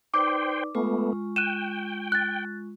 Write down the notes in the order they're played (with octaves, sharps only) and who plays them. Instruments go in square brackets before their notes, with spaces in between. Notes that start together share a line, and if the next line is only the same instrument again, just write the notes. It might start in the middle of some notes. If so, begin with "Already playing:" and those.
[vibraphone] D#4 B4 D5 [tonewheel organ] C5 G5 [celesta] D6
[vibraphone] G#3 F4 C#6 [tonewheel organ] A3 B3
[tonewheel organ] G5 [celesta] F#6 D#7 E7
[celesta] F#6 A6